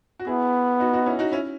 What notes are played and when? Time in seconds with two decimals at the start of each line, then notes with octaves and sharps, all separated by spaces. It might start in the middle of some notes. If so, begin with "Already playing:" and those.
0.20 F#4
0.27 B3 E4 G#4
0.80 D#4 F#4
0.93 D#4 F#4
1.06 C#4 E4
1.19 D#4 F#4
1.32 C#4 E4